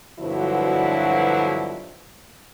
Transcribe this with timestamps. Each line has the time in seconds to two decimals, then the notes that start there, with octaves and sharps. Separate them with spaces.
0.19 G2 B2 D3 F3 F#3 E4